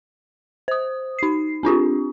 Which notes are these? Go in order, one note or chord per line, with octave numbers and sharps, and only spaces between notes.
C5 D#6
D#4 C7
C4 D4 F4 G4